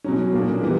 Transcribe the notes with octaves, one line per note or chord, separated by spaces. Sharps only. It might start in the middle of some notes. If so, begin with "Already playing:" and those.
B2 F#3 C#4
A#2 A#3 D4
E3 G3 B3